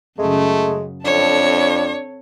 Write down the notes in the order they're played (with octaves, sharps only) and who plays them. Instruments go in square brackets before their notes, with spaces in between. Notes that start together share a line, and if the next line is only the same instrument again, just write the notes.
[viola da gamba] F#2 C#3 [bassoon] G#3 [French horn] A3
[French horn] F2 [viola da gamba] C4 A4 [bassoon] D4 [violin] C#5